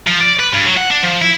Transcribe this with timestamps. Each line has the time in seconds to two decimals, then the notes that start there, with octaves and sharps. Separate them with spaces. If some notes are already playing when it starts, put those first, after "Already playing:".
0.07 F3
0.21 D5
0.40 B4
0.54 G2
0.66 F#3
0.77 F#5
0.91 D4
1.03 F3
1.22 E4